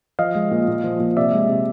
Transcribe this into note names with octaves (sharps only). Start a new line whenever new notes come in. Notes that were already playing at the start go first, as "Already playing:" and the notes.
F3 D#5 F5
G#3
A#2
A#2
F3
A#2
C3 D5 E5
G#3
C3